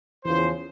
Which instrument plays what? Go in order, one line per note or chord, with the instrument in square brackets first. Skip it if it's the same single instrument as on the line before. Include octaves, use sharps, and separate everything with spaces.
[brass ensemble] E2 C#3 F3 C5